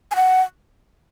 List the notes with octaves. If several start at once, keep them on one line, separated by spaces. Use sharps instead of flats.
G#5
F#5